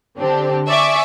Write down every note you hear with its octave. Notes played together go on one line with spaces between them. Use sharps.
D3 C4 D4 G4
D5 E5 G#5 C#6 D6